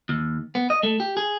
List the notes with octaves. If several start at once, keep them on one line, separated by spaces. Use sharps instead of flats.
D#2
B3
D#5
A3
G4
G#4